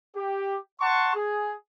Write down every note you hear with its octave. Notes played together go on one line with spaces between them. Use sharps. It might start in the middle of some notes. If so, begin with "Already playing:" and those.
G4
F#5 A5 C6 C#6
G#4